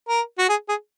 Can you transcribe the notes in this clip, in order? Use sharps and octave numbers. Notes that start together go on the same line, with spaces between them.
A#4
F#4
G#4
G#4